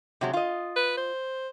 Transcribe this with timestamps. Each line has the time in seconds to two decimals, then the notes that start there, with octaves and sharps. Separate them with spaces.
0.21 C3 F#3 G#3
0.33 F4 D#5
0.76 B4
0.97 C5